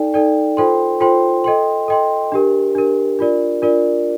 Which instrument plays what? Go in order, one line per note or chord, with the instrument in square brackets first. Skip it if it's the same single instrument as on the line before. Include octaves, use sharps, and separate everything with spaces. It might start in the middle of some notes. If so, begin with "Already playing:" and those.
Already playing: [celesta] D#4 A4 D5 G5
D#4 A4 D5 G5
F4 A4 C5 G5 C6
F4 A4 C5 G5 C6
A4 D#5 G5 C6
A4 D#5 G5 C6
D4 G4 A#4
D4 G4 A#4
D4 F4 A#4 D5
D4 F4 A#4 D5